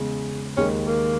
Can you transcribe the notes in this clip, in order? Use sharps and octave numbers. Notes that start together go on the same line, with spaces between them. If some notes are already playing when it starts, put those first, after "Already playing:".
Already playing: E2 C#3 G#3
D#2 D#3 G#3 C#4
A#3